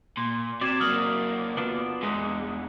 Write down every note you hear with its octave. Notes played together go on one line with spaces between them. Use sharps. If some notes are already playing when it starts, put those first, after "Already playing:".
A#2 C6
C3 F#4 D5 G#6 E7
F#3 A#3 D#6 F6 F#7
B3 D4 F4
E2 D3 G#3